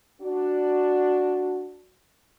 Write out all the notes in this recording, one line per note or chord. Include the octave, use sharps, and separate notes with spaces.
D4 F#4